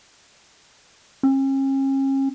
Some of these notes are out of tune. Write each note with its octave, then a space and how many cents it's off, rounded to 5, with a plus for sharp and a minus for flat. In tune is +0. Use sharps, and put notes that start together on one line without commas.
C#4 -40